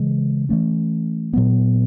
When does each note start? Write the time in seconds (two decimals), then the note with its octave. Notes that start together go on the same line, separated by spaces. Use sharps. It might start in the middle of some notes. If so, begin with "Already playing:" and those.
Already playing: C#3 E3 G#3
0.49 E3 A3 C#4
1.33 A#2 F#3 B3